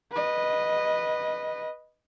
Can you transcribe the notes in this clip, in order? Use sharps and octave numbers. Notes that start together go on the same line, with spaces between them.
B4 D#5